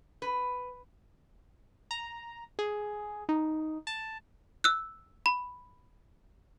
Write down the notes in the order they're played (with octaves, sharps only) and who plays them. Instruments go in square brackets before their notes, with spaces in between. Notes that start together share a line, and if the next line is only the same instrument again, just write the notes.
[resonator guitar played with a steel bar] B4
[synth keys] A#5
G#4
D#4
A5
[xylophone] E6 F#6
B5